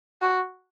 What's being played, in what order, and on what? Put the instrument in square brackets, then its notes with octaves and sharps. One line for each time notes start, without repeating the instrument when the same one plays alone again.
[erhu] F#4